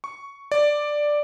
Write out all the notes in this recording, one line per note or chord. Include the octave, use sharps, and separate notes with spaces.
C#6
D5